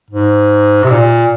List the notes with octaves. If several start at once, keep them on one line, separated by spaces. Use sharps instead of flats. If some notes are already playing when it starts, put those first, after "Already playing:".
G#2
C3
A#2